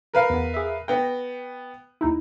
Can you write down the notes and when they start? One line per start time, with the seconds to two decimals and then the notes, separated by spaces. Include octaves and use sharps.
0.14 A#4 B4 F5
0.30 E2 B3
0.54 G#4 E5
0.88 B3 G5 A#6
2.01 D#2 D#4 E4